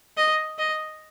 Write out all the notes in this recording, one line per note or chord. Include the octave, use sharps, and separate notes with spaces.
D#5
D#5